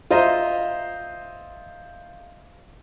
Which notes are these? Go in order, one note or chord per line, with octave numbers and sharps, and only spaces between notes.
F4 C5 D#5 E5 A#5